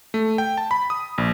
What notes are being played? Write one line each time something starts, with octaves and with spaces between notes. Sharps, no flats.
A3
G5
A5
B5
D#6
A#1